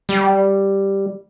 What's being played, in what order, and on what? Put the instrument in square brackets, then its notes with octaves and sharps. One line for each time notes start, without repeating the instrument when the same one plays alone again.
[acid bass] G3